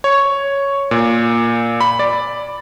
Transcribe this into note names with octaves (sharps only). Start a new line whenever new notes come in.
C#5
A#2
B5
D5